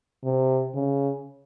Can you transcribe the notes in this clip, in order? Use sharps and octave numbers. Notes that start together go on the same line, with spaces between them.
C3
C#3